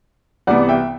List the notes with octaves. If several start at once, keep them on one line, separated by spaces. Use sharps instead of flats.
C2 C3 E3 B3 D5 F#5
E5 G5